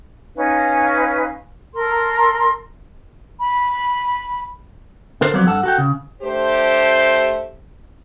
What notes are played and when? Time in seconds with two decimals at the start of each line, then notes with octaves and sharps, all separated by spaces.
0.34 C#4 D#4 B4 F5
1.73 A4 A#4 C6
3.39 B5
5.21 D3 A4 A#4 C5
5.34 F3 F#3 B3 C4 D5
5.46 G2 A4 F#5 A5
5.63 F#4 A4 G5
5.78 C#3
6.23 A3 D4 G4 C5